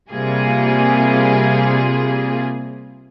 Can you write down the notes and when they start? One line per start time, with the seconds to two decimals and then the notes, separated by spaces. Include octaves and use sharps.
0.12 C3 G3 A#3 F4 G#4